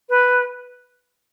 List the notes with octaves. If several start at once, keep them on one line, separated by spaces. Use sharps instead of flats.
B4